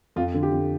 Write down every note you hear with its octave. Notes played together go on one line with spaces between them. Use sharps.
F2 F4
D3
G4
F2